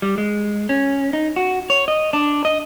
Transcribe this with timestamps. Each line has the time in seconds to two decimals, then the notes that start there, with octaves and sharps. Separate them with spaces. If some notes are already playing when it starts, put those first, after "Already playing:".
0.02 G3
0.18 G#3
0.69 C#4
1.13 D#4
1.36 F#4
1.70 C#5
1.88 D#5
2.13 D4
2.45 D#5